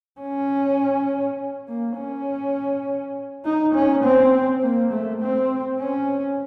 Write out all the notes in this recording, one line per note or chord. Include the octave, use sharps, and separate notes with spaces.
C#4
A#3
C#4
D#4
C#4
C4
A#3
A3
C4
C#4